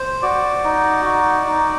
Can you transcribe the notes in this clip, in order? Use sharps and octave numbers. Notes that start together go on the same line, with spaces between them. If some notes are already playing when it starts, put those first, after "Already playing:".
Already playing: C5
F#4 D5
D#4
F#4
D#4